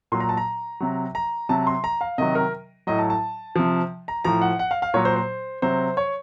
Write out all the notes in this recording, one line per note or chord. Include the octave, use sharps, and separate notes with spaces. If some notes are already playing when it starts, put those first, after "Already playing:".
A#2 F#3 C6
A#5
A5
A#5
C3 F#3
A#5
C3 F#3 A5
C6
A#5
F5
C3 D#3 F#3 D#5
A#4
A2 F#3 D#5
A5
A5
C3 F3
A#5
A2 F3 A#5
F#5
F#5
F5
F5
A#2 F#3 C#5
C5
C5
C3 F#3 C5
C#5